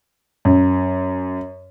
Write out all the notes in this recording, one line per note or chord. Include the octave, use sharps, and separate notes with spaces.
F#2